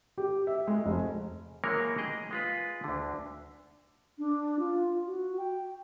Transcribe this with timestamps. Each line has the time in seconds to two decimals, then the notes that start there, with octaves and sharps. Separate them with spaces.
0.18 G4
0.47 E5
0.67 G#3
0.86 F1
1.64 E3 F#3 G#3 A#3 A#4 C#5
1.98 G#4 D#5 G5
2.31 G#3 F4 B4
2.84 D2 D3
4.18 D4
4.59 F4
5.07 F#4
5.38 G5